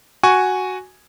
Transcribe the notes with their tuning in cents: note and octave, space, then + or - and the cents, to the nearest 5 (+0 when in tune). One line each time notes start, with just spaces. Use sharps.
F#4 +0 G#5 +0 C#6 +0